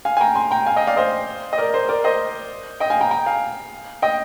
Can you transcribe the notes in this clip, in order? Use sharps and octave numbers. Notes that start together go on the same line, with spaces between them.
F5 G#5
G#5
G5 A#5
G#5 C6
G5 A#5
F5 G#5
D#5 G5
D5 F5
C5 D#5
D#5
A#4 D5
C5
A#4 D5
C5 D#5
D#5 G5
F5 G#5
G5 A#5
G5 A#5
F5 G#5
D#5 G5